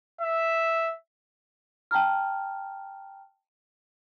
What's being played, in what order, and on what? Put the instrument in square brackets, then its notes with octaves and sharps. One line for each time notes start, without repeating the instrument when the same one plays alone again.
[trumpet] E5
[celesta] G5 A5 A#5 F6